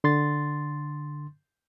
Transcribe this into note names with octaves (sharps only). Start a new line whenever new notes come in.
D3 C6 A6